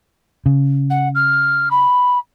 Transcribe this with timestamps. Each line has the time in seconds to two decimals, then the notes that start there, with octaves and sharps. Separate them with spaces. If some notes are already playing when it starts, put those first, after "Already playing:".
0.46 C#3
0.90 F#5
1.15 F6
1.71 B5